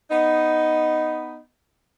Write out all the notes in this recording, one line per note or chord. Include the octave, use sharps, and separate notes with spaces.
B3 D#4